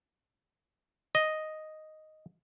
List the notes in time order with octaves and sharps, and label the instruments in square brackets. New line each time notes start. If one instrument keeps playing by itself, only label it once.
[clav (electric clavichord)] D#5